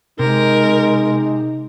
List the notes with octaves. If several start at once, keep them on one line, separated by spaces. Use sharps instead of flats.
C3 G#3 D#4 A#4